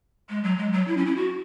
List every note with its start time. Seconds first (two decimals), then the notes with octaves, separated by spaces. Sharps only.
0.29 G#3
0.44 F#3
0.58 G#3
0.73 F#3
0.88 E4
0.97 C#4
1.06 E4
1.17 F#4